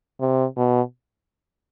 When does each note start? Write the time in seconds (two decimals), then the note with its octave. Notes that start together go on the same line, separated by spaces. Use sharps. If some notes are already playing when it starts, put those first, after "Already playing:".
0.20 C3
0.56 B2